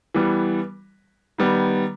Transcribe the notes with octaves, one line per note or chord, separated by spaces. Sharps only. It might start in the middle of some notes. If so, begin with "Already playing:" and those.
E3 G3 B3
D#3 G3 B3